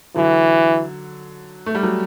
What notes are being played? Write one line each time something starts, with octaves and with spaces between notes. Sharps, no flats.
D3 E3 F#3
A3
G3
F#3